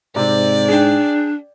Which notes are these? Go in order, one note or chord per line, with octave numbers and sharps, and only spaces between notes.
G#2 C3 C4 D5
D4 G#4 G5